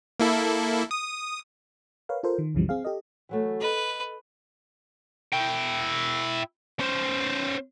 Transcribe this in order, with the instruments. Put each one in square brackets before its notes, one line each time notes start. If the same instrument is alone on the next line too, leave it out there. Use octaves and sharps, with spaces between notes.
[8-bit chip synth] A#3 E4 A4
D#6
[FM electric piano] A#4 B4 C#5 F5
F4 A4 A#4 C5
D#3
C2 F#2 C#3 E3 F3 G3
C4 G#4 F5
G4 A4 D#5
[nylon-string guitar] E3 F#3 A3
[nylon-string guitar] A4 D#5 [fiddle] B4
[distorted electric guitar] E4 G5
C#4 C5